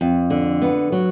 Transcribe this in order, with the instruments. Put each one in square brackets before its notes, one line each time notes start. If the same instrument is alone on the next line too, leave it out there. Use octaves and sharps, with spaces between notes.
[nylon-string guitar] F2
D3
B3
F#3